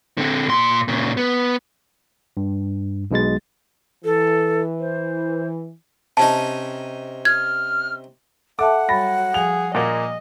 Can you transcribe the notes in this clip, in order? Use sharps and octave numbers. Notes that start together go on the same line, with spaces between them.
D3 C4
A#2 C6
A#2 C#3
B3
G2
B1 B2 G#3 A6
E3 A4
C5
C3 C#4 D#4 A5
F6 G#6
A4 E5 F#5 A5 D6
F#3 G3 B5 A6 A#6
F3 G#4 F7
A#2 A#3 D#5